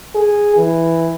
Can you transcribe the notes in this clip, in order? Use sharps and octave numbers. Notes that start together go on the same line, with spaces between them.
G#4
E3